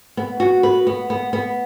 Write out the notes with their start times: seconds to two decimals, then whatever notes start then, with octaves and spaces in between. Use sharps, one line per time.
0.17 B3
0.40 F#4
0.63 B4
0.87 B3
1.10 B3
1.33 B3